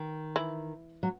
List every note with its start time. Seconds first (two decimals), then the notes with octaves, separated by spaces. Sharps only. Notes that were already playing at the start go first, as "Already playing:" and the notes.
Already playing: D#3
0.36 E3 E4
1.03 F#3